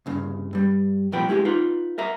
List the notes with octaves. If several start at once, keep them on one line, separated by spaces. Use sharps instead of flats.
C2 G2 C#3
G2 G3
C2 A#2 F3 B4 G5
G#3 E4 G4 G#4
D#4 F4 B4
A#4 E5 A#5